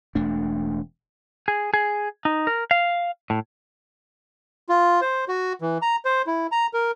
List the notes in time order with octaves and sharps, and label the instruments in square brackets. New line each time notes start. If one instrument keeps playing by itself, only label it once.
[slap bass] E1 A3 D4
[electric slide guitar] G#4
G#4
D#4
A#4
F5
A2
[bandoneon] F4
C5
F#4
E3
A#5
C5
E4
A#5
A#4